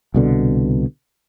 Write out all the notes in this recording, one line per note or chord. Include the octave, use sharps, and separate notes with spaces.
C2 B2 D3